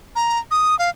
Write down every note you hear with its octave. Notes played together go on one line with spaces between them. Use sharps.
A#5
D#6
F5